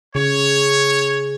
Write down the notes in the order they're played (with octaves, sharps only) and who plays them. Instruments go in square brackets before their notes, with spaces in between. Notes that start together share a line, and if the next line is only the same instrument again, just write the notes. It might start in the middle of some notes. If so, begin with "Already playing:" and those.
[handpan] C#3 [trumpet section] C#5